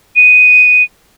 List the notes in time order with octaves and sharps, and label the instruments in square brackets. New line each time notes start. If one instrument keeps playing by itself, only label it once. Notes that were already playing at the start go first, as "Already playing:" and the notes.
[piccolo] D#7